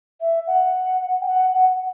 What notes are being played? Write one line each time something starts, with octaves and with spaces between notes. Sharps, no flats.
E5
F#5
G5
F#5
F#5